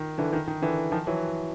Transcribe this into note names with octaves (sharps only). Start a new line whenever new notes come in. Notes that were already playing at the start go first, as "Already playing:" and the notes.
Already playing: D#3
D3 E3
D#3
D#3
D3 E3
D#3 F3
E3 F#3